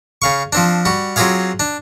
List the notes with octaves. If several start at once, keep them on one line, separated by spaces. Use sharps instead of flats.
C#3 F5 C#6
F3 C4 D4
G3 F#4
F#3 C4 F4 G4 G#4 F5
D4